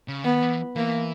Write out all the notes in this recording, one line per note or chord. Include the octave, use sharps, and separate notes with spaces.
C#3
D#3 B3
E3
E3 A#3